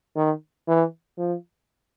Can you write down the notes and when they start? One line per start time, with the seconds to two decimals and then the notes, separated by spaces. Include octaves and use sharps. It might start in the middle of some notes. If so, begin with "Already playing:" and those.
0.16 D#3
0.68 E3
1.18 F3